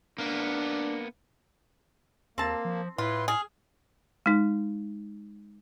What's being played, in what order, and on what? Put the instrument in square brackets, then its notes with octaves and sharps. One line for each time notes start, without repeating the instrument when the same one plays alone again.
[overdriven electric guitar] A#3 B3 [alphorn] D4
[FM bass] D#2 [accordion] A#3 [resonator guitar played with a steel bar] C4 A5
[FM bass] F3
[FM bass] A2 [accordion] E4 B4 C6 [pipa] F4
[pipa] G#4 [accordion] F6
[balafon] G#3 D#4